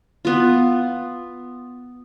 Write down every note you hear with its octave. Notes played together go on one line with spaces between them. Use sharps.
B3 F4